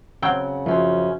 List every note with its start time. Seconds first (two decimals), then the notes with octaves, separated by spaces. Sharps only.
0.22 C#3 F#3 C4 F#5 G5
0.66 F#2 F3 C#4 C5